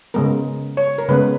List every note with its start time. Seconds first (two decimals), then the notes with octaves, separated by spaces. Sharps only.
0.14 C#3 G#3 B3 A#4
0.77 C#5
0.98 A#4
1.08 C#3 G#3 B3 B4